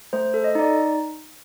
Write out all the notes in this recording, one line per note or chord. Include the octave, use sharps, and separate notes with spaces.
A3 C5
A4
D#5
D#4 D5